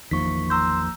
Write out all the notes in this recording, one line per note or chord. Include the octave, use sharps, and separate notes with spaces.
G#1 E2 D#3 F3 A#3 C#6 B6
A#5 C6 E6 G6